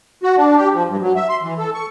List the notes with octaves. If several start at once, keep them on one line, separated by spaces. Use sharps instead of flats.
F#4
D4
G4
F3
G2
F#3
E5
C6
E3
A4
C#6